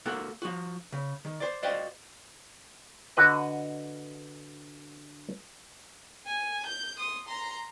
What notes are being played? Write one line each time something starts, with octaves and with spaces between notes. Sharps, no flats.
A#3 F#4 A4 A#4 F#5
F3 F#4
C#3
D#3
C5 D5
F#4 C5 D5 D#5 F5 G5
D3 F#4 B4 D#5
G#5
G6
C6 D#6
A#5 C6